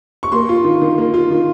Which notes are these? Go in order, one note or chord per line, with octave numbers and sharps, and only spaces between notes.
C#6
A#3 C6
F4
D#3
D#3
A#3
F4
D#3